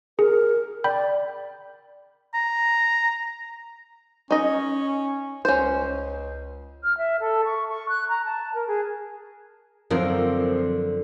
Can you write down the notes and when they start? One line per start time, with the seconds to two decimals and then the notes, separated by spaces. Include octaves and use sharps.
0.19 G#4 A#4
0.84 D5 G5 B5 G6
2.34 A#5
4.31 C#4 D#4 D#5
5.45 C#2 C#4 C5
6.83 F6
6.98 E5
7.20 A4
7.45 C#6
7.69 C#6
7.89 F#6
8.09 A#5
8.25 A5
8.54 A#4
8.67 G#4
9.90 F#2 D3 F3 C4 A#4 C5